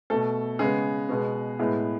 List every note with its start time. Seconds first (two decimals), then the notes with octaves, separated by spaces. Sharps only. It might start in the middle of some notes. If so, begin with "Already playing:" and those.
0.10 B2 A3 A4
0.59 C#3 G#3 B3 G#4
1.09 B2 G#3 B3
1.59 A2 G#3 B3